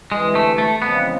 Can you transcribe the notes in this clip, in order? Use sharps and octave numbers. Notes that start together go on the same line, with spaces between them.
D2 C3 E3 G#3
A3
A3
E2 C#3 F3 G#3 B3 C4